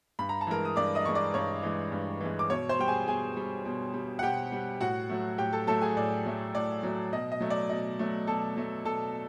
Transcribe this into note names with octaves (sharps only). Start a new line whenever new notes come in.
G2 B5
A#5
A5
E3 G#3 A#4 A#5
D#6
G2 D5 D6
D#5 D#6
E3 G#3 C#6
D5 D6
G2 C#5 C#6
E3 G#3
G2
E3 G#3
D6
B2 C#5 C#6
C5 C6
G3 G5
G#4 G#5
B2 G#4 G#5
G3
B2
G3
F#5
B2 G4 G5
G3
A2 F#4 F#5
F#3 A3
A2 G4 G5
A4 A5
F#3 A3 A4 A5
G#4 G#5
A2 D5
F#3 A3
A2 D5
F#3 A3
B2 D#5
D#5
F#3 A3
D5
B2 D#5
F#3 A3
B2 A4 A5
F#3 A3
B2 A4 A5